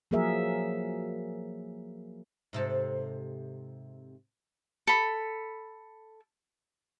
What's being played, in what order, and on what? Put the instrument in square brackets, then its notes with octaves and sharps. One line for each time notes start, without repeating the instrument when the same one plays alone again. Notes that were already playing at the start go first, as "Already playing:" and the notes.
[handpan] F3 F#3 A#3 G#4 A#4 E5
[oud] G#2 C3 A4
[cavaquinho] A4 B5